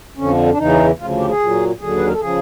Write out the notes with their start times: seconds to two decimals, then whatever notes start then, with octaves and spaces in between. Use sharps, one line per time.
0.17 F2 D3 F3 C#4
0.51 D4
0.58 E2 C#3 E3 D#4
0.99 D2 C#3 F3 F4
1.19 G4
1.29 G#4
1.40 A#2 F#3
1.80 D#2 D3 F#3 G#4
1.97 B4
2.06 A#4
2.13 A4
2.21 C#3 F3 G#4